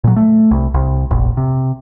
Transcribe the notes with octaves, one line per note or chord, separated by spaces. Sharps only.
A#2 F#3
A3
C2
C2
F1 A#1
C3